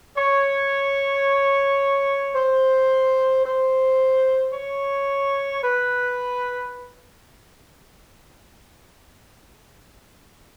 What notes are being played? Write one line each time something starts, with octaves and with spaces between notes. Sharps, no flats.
C#5
C5
C5
C#5
B4